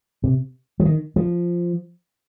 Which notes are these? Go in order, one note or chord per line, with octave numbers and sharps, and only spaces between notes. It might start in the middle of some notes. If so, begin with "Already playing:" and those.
C3
F3
D#3
F3